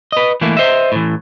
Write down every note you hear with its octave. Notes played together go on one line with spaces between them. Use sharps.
B4 D#5
E3 A3 A#3 E4
C5 D#5 E5
A2 E3